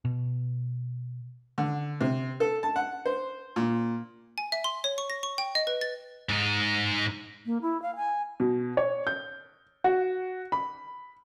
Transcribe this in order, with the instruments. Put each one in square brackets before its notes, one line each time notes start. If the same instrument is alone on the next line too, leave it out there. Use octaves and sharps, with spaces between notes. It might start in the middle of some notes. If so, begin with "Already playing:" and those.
[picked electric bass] B2
[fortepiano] D3
C3
A4
A5
F#5
C5
A#2
[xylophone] G#5
E5
C6
C#5
C#6
A#6
C#6
G5
D#5
B4
A6
[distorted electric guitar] G#2 D#4
[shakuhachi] A#3
E4
F5
G#5
[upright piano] B2
C#5
G6
F#4
B5